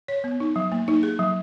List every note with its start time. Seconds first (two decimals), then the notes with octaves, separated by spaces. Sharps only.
0.08 C#5
0.24 B3
0.40 D#4
0.56 F#3
0.72 A#3
0.88 D#4
1.03 G#4
1.19 F#3